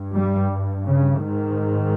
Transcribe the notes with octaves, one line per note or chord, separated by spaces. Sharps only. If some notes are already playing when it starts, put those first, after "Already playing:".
Already playing: G2
G3
C#3
G#2 D#3